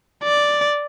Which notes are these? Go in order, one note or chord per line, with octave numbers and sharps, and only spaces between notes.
D5